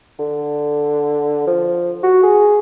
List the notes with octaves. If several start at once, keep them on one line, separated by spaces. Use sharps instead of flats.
D3
F3
F#4
G#4